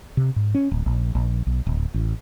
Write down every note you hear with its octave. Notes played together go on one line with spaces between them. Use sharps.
C3
G#2
C#4
D1
A#1
A#1
B1
D1
A1